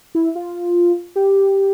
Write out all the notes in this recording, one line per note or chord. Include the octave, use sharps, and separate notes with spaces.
E4
F4
G4